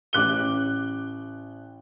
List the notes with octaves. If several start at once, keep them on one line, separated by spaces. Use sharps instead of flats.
A1 D6 F#6 G7